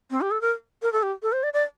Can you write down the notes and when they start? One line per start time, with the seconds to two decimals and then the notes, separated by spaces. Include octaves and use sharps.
0.11 C4
0.21 G4
0.31 A4
0.41 A#4
0.82 A#4
0.92 A4
1.03 G4
1.22 A4
1.32 C5
1.43 D5
1.53 D5